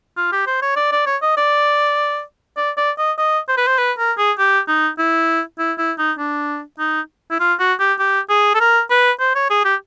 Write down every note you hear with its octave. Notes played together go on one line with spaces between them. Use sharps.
F4
G4
C5
C#5
D5
D5
C#5
D#5
D5
D5
D5
D#5
D#5
C5
B4
C5
B4
A#4
G#4
G4
D#4
E4
E4
E4
D#4
D4
D#4
E4
F4
F#4
G4
G4
G#4
A4
A#4
B4
C5
C#5
G#4
G4